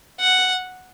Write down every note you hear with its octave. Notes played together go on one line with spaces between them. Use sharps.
F#5